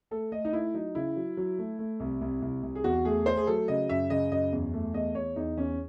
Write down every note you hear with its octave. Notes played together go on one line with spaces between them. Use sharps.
A3 A4
A3 D#5
D#4
A3 E4
F#3 D#4
C#3 E4
F#3
F#3
A3
A3
C2
C2
C2
C2
G#4
E2 F#4
A3 G#4
A3 C5
G#4
F#3 A4
C#3 D#5
F#2 E5
C#3 D#5
F#2 D#5
E2
A3
E2 D#5
E2 C#5
E2 D#4
E2 C#4